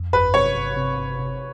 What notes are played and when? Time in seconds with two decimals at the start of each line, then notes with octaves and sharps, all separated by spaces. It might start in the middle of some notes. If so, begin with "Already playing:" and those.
Already playing: F2
0.13 G1 B4
0.34 C3 C#5
0.55 G1
0.77 C3
0.98 G1
1.19 C3